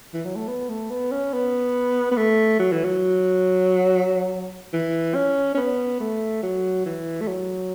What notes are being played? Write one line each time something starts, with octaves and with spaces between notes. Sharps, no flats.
E3
F#3
A3
B3
A3
B3
C#4
B3
B3
A3
F#3
E3
F#3
E3
C#4
C#4
B3
A3
F#3
E3
A3
F#3